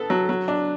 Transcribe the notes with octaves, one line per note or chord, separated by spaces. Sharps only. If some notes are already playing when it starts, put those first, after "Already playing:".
Already playing: B3 A4
F#3
F#3
D4